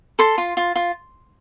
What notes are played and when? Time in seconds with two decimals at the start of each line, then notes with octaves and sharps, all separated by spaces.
0.19 A4 C6
0.38 F4
0.57 F4
0.76 F4